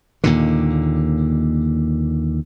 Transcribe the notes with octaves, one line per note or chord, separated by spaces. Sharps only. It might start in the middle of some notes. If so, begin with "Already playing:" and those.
D#2 A#2 D3